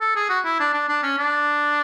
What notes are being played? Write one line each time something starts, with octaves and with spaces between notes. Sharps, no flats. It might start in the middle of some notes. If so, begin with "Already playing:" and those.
A4
G#4
F#4
E4
D4
D4
D4
C#4
D4